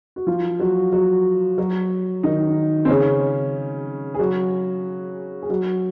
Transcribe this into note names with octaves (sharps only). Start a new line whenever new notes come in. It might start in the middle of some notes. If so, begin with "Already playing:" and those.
F#4
F3 F4
F#3 F#4
F#3 F#4
F#3 F#4
D#3 D#4
C4
C#3 C#4
G#4
F#3 F#4
G#4
F#3 F#4